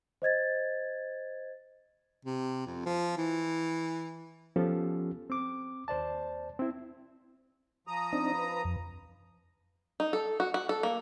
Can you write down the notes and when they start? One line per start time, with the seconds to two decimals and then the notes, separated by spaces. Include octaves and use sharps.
0.22 C5 D#5 G#6 A6
2.25 C3
2.66 F2
2.86 F3
3.17 E3
4.56 F3 B3 C#4 F4 G4 A4
5.30 C4 D6
5.88 D#2 C5 D5 A5
6.59 C4 E4
7.87 F3 A#5 D#6
8.13 C4 D4 D#4
8.34 B4
8.65 F2
10.00 D#4
10.13 A4
10.40 F#4
10.54 F#4
10.69 A4
10.83 A#3